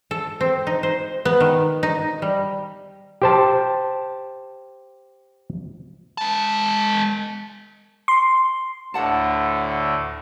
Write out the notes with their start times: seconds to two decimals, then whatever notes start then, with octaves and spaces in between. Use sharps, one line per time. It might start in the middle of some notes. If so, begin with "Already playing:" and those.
0.11 A4
0.41 C4
0.67 D#4
0.83 C5
1.25 B3
1.40 D#3
1.83 D#4
2.22 G3
3.22 G4 C5 A5
6.18 G#3 A5
8.08 C6
8.94 D2 A2 D3 A4 F#5 A5